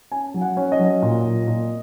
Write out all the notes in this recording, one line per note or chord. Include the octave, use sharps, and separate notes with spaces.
C#4 G#5
F#3
F#5
C#4
D#5
F#3
A#2
A#2
A#2